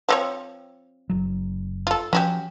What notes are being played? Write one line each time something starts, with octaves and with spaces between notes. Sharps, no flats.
F3 C4 C#5
F#1 F#3
F4 A4
F3 C#4 F#4 G4